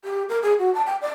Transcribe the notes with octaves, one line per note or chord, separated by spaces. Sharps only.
G4
A#4
G#4
F#4
A5
G5
D5